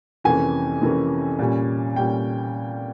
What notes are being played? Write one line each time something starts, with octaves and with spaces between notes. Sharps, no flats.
F2 C3 E3 A#3 C#4 G#5
F2 C3 E3 A#3 C#4
A#2 G3 C#4
A#2 G3 C#4 G5